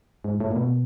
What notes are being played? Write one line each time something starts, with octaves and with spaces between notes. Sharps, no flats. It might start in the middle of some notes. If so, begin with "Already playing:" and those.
G#2
A2
A#2
B2